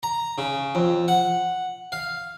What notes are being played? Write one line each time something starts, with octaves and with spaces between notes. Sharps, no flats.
A#5
C#3
F2
F#5
F5